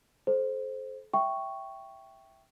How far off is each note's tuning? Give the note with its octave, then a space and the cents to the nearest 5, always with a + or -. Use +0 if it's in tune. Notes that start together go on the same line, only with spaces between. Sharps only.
A4 -35 C5 +0
E5 +0 G5 -5 C#6 +0